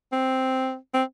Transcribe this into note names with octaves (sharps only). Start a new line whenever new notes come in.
C4
C4